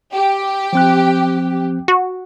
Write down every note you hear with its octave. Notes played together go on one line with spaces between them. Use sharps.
G4
F3 C4 F#6
F#4